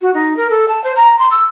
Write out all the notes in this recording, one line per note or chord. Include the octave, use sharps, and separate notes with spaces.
F#4
D#4
A#4
A4
A5
C5
A#5
C6
E6